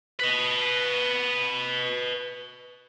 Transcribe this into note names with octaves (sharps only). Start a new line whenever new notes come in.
B4 D#5